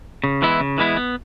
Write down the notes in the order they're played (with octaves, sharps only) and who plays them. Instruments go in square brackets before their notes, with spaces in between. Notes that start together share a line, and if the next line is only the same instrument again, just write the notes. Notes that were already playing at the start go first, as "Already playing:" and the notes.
[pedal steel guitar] C#3
E3 G#3 B3 E4
C#3
E3 G#3 B3 E4
B3